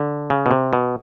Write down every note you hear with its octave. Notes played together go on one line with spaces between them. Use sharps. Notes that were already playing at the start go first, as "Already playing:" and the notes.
Already playing: D3
C#3
B2
C3
B2